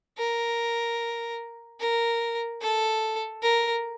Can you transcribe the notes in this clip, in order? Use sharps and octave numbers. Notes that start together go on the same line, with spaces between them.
A#4
A#4
A4
A#4